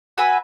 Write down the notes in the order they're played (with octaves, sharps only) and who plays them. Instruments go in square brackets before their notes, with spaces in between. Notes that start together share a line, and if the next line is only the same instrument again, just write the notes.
[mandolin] F#4 B4 E5 G#5